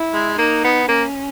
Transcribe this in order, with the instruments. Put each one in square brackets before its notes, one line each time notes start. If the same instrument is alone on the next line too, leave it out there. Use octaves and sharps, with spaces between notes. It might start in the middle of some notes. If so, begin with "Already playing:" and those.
Already playing: [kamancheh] E4
[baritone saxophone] G#3
[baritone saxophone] A#3 [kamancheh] D#4
[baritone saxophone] B3
[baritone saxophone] A#3 [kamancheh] C#4